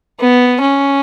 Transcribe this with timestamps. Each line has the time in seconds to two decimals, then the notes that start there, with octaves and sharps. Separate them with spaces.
0.19 B3
0.61 C#4